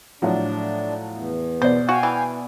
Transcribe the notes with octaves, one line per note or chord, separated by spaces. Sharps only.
A2 F3 F#3 D4
E2
B2 C5 D5
F#4 F5 G5 G#5
E3